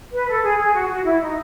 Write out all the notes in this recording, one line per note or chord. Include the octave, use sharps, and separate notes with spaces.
B4
A4
G#4
G#4
F#4
F#4
E4
D#4